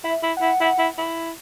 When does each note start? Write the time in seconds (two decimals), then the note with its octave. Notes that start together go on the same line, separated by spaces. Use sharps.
0.04 E4 E5
0.23 E4
0.37 E4 F#5
0.60 E4
0.79 E4
0.98 E4